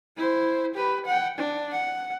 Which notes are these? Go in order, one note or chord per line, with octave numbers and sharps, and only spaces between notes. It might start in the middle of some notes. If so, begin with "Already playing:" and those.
E4 C5
G4 B4
F#5 G5
D4
F#5